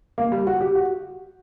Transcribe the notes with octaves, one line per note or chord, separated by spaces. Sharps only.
A#3
G3
F#4
G4
F#4